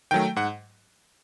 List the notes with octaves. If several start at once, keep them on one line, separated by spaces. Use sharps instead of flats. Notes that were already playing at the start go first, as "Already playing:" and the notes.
D#3 F#3 A3 G5
G#2 F#5